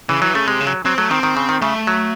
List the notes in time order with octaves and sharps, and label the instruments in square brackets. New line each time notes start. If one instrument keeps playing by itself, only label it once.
[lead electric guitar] C#3 [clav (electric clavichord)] E3
[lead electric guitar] E3 [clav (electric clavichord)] F#3
[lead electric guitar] C#3 [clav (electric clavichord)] A3
[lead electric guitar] C3 [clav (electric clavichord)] G#3
[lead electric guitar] C#3
[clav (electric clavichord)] F#3
[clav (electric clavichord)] F#3 [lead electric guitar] C4
[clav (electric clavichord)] F#3 [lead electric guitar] A3
[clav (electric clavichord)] D#3 [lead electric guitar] C4
[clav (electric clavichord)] D#3
C#3
D#3
[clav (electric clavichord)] C#3 [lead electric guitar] A3
[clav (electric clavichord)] F#3